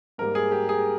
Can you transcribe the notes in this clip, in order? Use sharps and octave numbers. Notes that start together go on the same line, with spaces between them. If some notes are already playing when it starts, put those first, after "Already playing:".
G#2 G3 A#3 A#4
G#4
G4
G#4